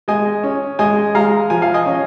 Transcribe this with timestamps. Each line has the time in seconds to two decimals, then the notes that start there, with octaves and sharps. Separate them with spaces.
0.08 G#3 D#5 G#5
0.43 C#4
0.79 G#3 D#5 G#5
1.15 G#3 F5 A#5
1.50 F3 G#5
1.62 F5
1.74 D#5 G#5
1.86 C#4